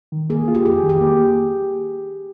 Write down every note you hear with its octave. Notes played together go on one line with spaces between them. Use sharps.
D#3
A#3 G#4
F4
G4
F2 G#4
D#3
G4
A#3